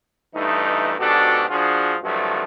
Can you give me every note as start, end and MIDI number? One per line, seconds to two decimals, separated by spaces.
0.34 0.93 43
0.34 0.93 52
0.34 0.93 57
0.34 0.93 63
0.98 1.44 44
0.98 1.44 47
0.98 1.44 62
0.98 1.44 66
0.98 1.44 67
0.98 1.44 69
1.49 1.95 53
1.49 1.95 62
1.49 1.95 65
1.49 1.95 66
1.49 1.95 68
2.02 2.44 36
2.02 2.44 43
2.02 2.44 53
2.02 2.44 54
2.02 2.44 57